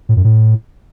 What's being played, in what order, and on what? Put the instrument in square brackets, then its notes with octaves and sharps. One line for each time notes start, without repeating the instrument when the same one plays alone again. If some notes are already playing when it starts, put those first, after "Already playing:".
[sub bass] A2
F#2
A2